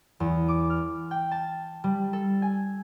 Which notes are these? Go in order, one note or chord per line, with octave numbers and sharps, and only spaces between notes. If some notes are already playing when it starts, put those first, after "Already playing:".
E2
D6
F6
G5
A5
G3
A4
G#5